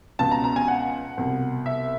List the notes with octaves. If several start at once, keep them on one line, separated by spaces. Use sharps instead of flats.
C#2 B2 A5
A#5
A#5
G#5
F#5
C2 B2
E5